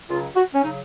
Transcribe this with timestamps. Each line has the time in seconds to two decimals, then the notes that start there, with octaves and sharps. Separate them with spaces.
0.09 C#2 C#3 F#3 F4
0.35 F#4
0.54 C#4
0.62 C#3 F#3 D#4